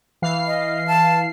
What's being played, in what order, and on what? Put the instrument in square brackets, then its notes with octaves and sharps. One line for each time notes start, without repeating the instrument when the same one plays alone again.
[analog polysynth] E3 F5 C7
[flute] D#5
A5